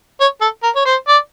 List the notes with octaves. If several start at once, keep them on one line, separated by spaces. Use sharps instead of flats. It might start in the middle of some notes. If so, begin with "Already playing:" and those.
C#5
A4
A#4
C#5
C5
D5